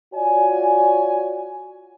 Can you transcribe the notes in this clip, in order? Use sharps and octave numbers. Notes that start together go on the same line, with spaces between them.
F4 F#4 C#5 D5 G#5